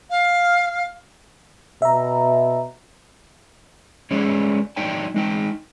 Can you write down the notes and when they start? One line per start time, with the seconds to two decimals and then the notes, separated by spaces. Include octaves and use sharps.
0.10 F5
1.82 B2 E5 A#5
4.11 G#3 C#4 G#4 B4 C#5 D5
4.76 F#3 D#4 D5 G5 A5
5.14 G#3 D#4 G5